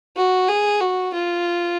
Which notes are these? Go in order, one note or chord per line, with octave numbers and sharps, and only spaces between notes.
F#4
G#4
F#4
F4